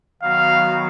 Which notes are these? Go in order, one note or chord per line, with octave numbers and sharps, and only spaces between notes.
D#3 F#3 B3 F#4 F5